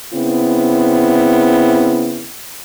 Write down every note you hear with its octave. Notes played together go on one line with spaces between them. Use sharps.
C#3 B3 C4 E4